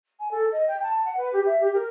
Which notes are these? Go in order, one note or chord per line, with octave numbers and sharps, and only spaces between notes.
G#5
A4
D#5
G5
A5
F#5
B4
G4
E5
G4
A#4